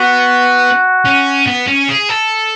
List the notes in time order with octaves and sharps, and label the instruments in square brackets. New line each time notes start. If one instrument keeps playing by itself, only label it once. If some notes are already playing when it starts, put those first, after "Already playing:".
Already playing: [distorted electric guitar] B3 [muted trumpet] F#4
[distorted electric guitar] C#4
B3
C#4
G#4
A4